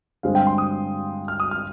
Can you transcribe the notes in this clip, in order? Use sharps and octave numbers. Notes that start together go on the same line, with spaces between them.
G2 D3 G#3 C4 F5
G5
C6
D#6
F6
D#6
F6